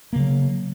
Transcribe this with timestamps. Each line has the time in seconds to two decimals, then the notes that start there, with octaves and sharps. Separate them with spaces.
0.13 A#3
0.16 C#3
0.19 F#3